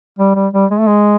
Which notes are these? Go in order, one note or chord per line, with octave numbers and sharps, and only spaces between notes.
G3
G3
G3
G#3
A3
G#3